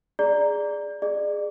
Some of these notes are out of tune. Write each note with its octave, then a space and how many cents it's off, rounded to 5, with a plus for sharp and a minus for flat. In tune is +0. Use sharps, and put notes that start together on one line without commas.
G#4 +0 D5 +0 A#5 +0
G#4 +0 D5 +30